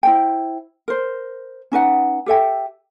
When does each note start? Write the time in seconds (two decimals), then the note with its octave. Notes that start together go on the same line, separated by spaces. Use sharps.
0.03 E4 C5 G5
0.88 A#4 C5
1.72 C#4 D#4 B4 F#5
2.26 G4 A4 E5 G5